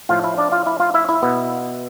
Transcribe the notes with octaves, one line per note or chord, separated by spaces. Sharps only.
A2 F3 A3 F4 F5
E4 E5
D4 D5
F4 F5
E4 E5
F4 F5
E4 E5
E4 E5
B2 B3